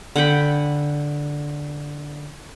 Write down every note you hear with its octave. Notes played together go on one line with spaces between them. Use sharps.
D3 F#5 G5 B5